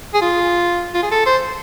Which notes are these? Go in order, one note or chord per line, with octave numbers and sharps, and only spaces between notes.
G#4
F4
F4
G#4
A4
C5